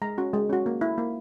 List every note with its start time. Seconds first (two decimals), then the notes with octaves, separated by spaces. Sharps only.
0.02 G#3 A#5
0.18 C#4 F#4
0.34 G#3
0.50 C#4 F#4
0.66 A#3
0.81 E4
0.98 A#3